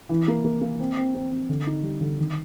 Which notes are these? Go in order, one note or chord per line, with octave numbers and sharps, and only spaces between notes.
E3
A#3
A#3
A#3
C4
C4
C4
C4
D3
D#4
G3
D3
D#3